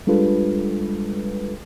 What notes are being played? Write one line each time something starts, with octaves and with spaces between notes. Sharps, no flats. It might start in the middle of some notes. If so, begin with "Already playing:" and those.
G3 G#3 D4 F4 A4 B4